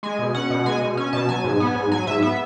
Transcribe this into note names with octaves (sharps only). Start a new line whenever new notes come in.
G#3 G#5
B2
C#4 F#5
B2
G#3 G#5
B2
C#4 G#5
B2 A5
F#3 G#5
G#2
B3
G#2
F#3 G#5
G#2 E5
B3 E5